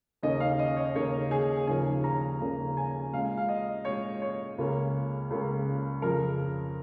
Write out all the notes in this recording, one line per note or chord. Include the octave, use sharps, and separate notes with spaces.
D#2 C#3 A#3 C#4 D#5
F5
D#5
C#5
D#2 C#3 A#3 C#4 C#5
G#4
D#2 C#3 F3 A#3 C#4 G#5
A#5
D#2 C#3 F3 A#3 C#4
G#5
A#2 G#3 C#4 F5
F5
D#5
A#2 G#3 C#4 C#5
C#5
C#2 C#3 A#3 C#4
C#2 C#3 A#3 C#4
F2 C#3 F3 A#4